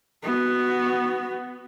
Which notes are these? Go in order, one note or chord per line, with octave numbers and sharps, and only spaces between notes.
B3 F#4